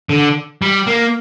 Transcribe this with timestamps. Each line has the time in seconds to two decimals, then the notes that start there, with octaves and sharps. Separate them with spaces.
0.09 D3
0.62 G3
0.87 A#3